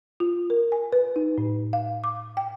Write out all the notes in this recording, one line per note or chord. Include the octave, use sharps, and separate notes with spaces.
F4
A#4
G#5
B4
D#4
A2
F5
D6
G5